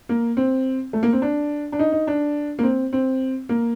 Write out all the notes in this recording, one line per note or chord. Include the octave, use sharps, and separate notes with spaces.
A#3
C4
A3
A#3
C4
D4
D4
D#4
D#4
D4
A#3
C4
C4
A#3